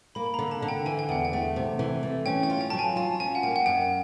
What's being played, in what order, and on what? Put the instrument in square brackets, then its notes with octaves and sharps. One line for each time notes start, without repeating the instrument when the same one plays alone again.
[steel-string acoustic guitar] A#3 [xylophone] B5
[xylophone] B5
[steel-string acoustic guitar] D3 [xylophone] A#5
[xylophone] A5
[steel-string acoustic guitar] D3
[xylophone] G5
[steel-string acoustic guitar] E3 [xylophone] G#5
[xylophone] G5
[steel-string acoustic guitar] E2 [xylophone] F#5
[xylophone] G5
[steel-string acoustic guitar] A3
C3
E3
A3
[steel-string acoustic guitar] C#4 [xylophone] G5
[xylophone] G5
[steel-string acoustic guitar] F4
[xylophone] G5
A5
[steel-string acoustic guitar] F#3
[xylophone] G#5
[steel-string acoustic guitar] F4 [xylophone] A5
[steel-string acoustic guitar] C#4 [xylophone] G#5
[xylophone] F#5
[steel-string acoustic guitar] A#3 [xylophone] G5
[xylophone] F#5
[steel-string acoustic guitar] F#2 [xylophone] G5